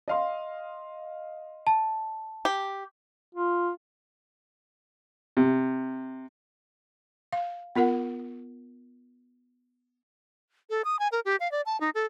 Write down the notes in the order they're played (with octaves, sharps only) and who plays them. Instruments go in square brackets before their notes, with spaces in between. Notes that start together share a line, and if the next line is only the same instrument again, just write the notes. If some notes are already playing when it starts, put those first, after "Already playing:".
[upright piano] D#5 F5 C6
[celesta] A5
[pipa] G4
[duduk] F4
[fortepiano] C3
[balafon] F5
B3 F4 A#4 F#5
[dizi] A4
D#6
G#5
A#4
G4
F5
D5
A5
D#4
A4